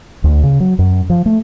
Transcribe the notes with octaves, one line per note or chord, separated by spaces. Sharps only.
D2
C#3
F#3
F#2
F3
A3